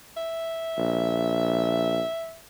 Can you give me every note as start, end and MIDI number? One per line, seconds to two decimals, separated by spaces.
0.17 2.37 76
0.77 2.02 34